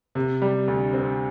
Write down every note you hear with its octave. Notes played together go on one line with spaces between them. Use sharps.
C3
G3
D2
C4